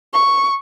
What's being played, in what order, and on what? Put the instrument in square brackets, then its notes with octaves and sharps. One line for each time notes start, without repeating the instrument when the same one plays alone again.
[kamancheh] C#6